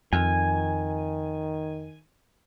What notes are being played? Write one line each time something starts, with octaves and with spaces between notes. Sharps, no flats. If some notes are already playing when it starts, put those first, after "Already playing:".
F2 D#3 G#5